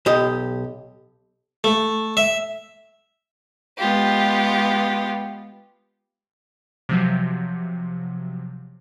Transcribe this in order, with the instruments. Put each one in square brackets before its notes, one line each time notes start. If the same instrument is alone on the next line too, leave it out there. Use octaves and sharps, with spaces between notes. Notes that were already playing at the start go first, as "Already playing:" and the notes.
[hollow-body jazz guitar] B1 G4 D#5
[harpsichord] A3
E5
[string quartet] G#3 B3 F4 G4
[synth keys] C3 F3 F#3